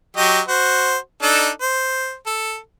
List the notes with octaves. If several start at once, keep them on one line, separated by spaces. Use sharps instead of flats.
F#3 G4 D#5
F#4 C5
D4 D#4 A4
C5
A4